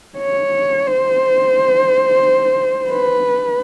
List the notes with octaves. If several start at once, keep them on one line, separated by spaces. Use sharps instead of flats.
C#5
C5
B4